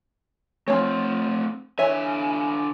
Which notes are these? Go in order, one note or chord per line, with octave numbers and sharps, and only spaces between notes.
F3 A3 C4 C#4 C#5
D3 E3 C#5 E5 G#5